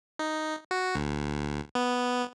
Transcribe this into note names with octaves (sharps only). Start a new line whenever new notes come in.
D#4
F#4
D2
B3